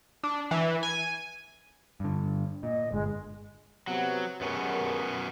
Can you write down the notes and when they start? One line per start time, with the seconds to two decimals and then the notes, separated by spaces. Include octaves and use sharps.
0.24 D4
0.51 E3
0.83 G#5
2.00 G2 D3
2.63 A#2 D#5
2.92 G1 G#3
3.87 C3 F#3 B3
4.41 F#2 G#3 B3 C#4 G4 A#4